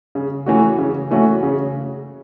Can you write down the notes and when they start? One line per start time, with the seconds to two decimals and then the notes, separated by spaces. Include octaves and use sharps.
0.15 C#3
0.46 E3 A3 C#4 F#4
0.78 C#3
1.11 E3 A3 C#4 F#4
1.43 C#3